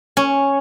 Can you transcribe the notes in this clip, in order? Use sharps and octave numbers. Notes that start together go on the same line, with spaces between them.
C#4